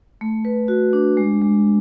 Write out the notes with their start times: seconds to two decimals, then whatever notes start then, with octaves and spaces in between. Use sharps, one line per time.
0.21 A3
0.45 B4
0.68 F#4
0.93 D4
1.17 G#3
1.41 G#3